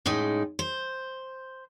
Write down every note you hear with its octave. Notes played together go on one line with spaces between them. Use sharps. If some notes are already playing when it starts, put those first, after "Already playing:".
A2 C#3 G#3 D#4
C5